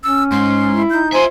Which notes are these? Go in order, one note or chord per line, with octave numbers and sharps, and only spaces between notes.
C#4 E6
G#2 C6
E4
D#4 G6
F4 C5 E5 G#5